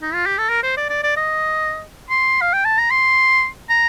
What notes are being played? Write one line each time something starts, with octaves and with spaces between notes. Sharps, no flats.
D#4
F4
G4
A4
A#4
C5
D5
D5
D5
D#5
C6
F5
G5
A5
A#5
C6
A#5